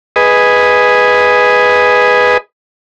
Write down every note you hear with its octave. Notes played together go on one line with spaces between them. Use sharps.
G#4 B4 D#5